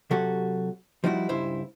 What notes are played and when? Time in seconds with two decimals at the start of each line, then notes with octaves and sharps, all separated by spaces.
0.11 C3 F#3 F#4 G4 A4
1.04 F3 G3 D#4 E4 F#4
1.29 C#2 G2 E4 C5